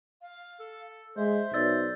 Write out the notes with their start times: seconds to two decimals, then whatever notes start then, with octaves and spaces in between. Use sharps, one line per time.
0.22 F5
0.60 A4
1.16 G#3 C5 E5
1.54 B1 C5 D5 E6 A6